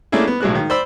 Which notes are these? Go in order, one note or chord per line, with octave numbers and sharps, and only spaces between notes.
A3 A#3 C#4 D4 E4 G#4
B3
B1 A2 G#3 F#4 F#6
D#3
C5 D5 B5 E6